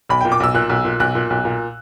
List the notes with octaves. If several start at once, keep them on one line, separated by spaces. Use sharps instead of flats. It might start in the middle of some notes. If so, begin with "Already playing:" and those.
B1 B5
A#2 G5
D6
B1 E6
A#2 F#6
B1
A#2
B1 F#6
A#2
B1
A#2